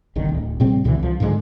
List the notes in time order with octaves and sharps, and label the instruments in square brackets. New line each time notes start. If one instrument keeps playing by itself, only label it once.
[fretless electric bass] G1 C2 D3 D#3
D1
A#2 C#3 G3 C4
C#2 B2 D3 E3
C2 F3
G#2 D3 F#3 G#3